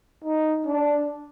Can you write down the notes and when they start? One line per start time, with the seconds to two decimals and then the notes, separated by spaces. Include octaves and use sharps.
0.24 D#4
0.67 D4